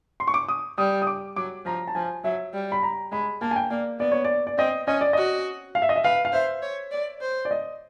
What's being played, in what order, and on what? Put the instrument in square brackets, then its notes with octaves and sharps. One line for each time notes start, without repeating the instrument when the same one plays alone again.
[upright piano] C6
C#6
D6
D#6
[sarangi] G3 [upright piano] D#6
[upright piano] D#6
D6
[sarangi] F#3 [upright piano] D6
[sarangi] F3 [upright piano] A#5
[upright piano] A5
[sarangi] F3 [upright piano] G#5
[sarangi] F#3 [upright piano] E5
[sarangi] G3
[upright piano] B5
A#5
[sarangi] G#3 [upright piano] B5
[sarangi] A#3 [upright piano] A5
[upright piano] G#5
G5
[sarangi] A#3 [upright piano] D5
[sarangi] B3 [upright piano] D5
[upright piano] C#5
D5
D5
[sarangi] C4 [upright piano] D#5
[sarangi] C#4 [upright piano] D#5
[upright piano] D5
[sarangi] F#4 [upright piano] D#5
[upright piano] F5
E5
D#5
E5
[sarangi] B4 [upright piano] F5
[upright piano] F5
[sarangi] C5 [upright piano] E5
[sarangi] C#5
D5
C5
[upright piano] D5
D#5